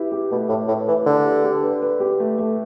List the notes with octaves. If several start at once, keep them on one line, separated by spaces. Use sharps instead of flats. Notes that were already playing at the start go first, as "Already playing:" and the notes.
Already playing: E4 G4 B4
G4
B2 A3
A2 A3
A2 B4
E3 B4
D3 E4
G4
G4
B4
B4
G4
A3
A3